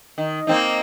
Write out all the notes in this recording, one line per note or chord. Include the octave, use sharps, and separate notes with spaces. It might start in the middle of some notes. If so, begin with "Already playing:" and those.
D#3
A#3 C4 D#4